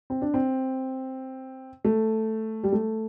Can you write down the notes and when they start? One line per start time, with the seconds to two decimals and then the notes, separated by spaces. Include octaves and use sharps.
0.10 C4
0.22 D4
0.34 C4
1.85 A3
2.63 G3
2.72 A3